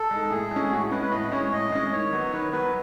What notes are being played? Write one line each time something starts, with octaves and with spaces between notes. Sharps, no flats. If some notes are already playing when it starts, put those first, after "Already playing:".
Already playing: A4
G#3 D#4
A2 G#4
G#3
C#4
A2 F#4
G#3 C#4 B4
B4
A2 D#5
G#3 C#4 C#5
A2 D#5
G#3 C#4
D#3 C#5
F#3 B3
D#3 B4
F#3 B3 B4